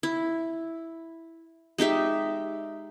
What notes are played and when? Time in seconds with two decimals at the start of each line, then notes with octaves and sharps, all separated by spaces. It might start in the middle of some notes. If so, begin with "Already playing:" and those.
0.03 E4
1.78 G#3 D#4 G4 E5